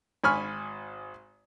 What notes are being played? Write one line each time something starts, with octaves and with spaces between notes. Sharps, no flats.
G#1 G#5 B5 C#6 F6